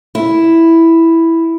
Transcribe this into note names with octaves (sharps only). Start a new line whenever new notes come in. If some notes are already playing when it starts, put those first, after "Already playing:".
E4